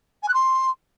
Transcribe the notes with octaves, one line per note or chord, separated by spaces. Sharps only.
G#5
F#6
C6